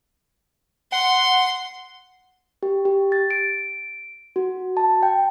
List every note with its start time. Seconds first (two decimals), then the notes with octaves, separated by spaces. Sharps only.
0.92 F#5 C6
2.63 G4
2.85 G4
3.12 A6
3.31 D7
4.36 F#4
4.77 A5
5.03 G5